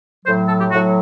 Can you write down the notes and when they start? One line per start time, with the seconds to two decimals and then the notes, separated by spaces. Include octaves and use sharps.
0.25 A2 F#3 C5
0.48 A4
0.59 G4
0.70 F#3 F#4
0.74 A2